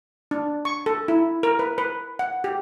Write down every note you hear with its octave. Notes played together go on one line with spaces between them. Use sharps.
D4
C#6
A4
E4
A#4
B4
B4
F#5
G4